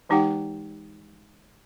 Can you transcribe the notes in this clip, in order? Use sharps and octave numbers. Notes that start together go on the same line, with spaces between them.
E3 G#3 D#4 G4 F#5 G5